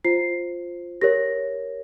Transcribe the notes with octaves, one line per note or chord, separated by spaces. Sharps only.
F4 C5 C7
G4 A#4 C#5 A#6